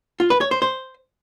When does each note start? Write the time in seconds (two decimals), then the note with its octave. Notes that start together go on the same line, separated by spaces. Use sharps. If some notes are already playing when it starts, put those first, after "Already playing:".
0.20 F4
0.30 B4
0.41 C#5
0.51 C5
0.62 C5